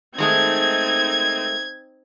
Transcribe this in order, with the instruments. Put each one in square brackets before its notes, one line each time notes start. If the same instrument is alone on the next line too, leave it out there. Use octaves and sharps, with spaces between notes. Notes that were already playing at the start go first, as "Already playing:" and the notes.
[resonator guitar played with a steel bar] D#3 G#3 A3 [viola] C4 D#4 [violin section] G#6